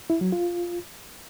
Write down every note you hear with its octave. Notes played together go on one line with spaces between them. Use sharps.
E4
F#3
F4